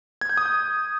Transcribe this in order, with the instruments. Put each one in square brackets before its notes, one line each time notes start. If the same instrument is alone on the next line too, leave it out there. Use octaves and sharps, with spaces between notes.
[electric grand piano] G#6
G6
D#6
G6